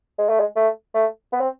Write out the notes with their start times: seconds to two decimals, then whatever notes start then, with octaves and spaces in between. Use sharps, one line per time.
0.18 G#3
0.29 A3
0.40 G#3
0.56 A3
0.94 A3
1.33 B3
1.40 C4